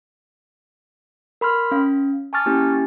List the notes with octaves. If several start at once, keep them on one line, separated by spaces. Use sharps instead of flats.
A#4 B5 C6 F6
C#4 F5
G#5 A5 C#6 D6 F6 A6
A#3 C#4 E4 G4 G#5